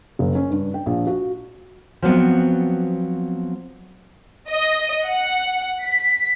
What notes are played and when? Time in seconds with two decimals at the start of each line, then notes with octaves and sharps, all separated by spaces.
0.19 F#1
0.35 C#4
0.50 G2
0.74 G5
0.86 A#1
1.07 F#4
2.02 F3 F#3 B3 C4
4.50 D#5
5.05 F#5
5.83 B6